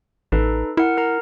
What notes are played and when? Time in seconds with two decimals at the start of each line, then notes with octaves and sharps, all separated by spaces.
0.32 A1 D#4 A4 B4
0.77 E4 A#4 F#5
0.98 A#4 A#5